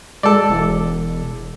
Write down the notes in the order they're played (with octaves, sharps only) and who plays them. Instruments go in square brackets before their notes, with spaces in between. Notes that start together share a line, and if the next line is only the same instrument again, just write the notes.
[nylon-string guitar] G#3 [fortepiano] A4 D5
[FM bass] E1